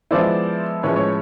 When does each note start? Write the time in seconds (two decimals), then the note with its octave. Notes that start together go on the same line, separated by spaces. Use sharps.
0.11 F3 G#3 B3 E4 C5 D5
0.83 A2 F3 G#3 C#4 B4 C#5
0.96 C#5